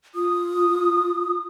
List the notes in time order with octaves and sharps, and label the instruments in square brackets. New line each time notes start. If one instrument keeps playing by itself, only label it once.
[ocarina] F4 [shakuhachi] D#6